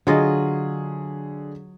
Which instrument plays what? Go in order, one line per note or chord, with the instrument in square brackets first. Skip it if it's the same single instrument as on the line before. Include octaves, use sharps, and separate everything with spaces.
[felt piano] D3 G#4 [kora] F#3 F4 D#5